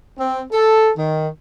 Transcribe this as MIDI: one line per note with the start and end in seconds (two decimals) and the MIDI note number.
0.18 0.41 60
0.51 0.90 69
0.96 1.26 51